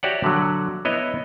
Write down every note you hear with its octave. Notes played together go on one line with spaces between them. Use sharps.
F#4 G4 C#5 D5 E5 F#5
D3 F#3
B3 E4 C#5 D#5